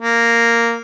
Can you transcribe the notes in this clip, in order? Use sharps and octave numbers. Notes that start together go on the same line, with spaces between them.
A#3